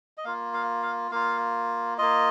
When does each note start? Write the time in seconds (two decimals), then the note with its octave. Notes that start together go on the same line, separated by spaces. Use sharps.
0.18 D#5
0.24 A#3 F4 F5
0.54 F5
0.83 F5
1.11 A#3 F4 F5
1.98 A#3 F4 D#5